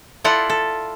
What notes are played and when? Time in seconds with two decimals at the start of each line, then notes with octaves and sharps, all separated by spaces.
0.24 E4 F4 A4 D5 F#5
0.50 A4